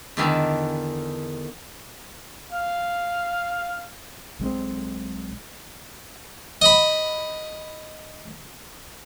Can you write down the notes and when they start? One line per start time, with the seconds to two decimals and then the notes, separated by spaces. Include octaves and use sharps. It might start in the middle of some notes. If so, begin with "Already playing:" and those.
0.17 E2 D3 D#3 E5 F5 G#5
2.52 F5
4.40 B1 G#3 C4
6.62 D#5 B5